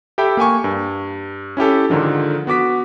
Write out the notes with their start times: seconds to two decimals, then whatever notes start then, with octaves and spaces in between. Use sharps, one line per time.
0.18 G4 A4 E5 G5 B5
0.37 A#3 G5 G#5 C#6
0.64 G2
1.57 C#4 E4 G4 A4
1.90 G#2 D3 D#3 F3
2.47 B3 F#4 D6 B6